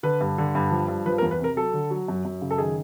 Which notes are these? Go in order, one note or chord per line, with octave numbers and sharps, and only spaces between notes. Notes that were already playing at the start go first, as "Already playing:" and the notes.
D3 B4
G2
D3
G2
F3
G2
F3 B4
A#4
E2
B4
C3 A#4
F#3 A4
D3
F#3
F#2
F#2
C#3
A4
D#3 G#4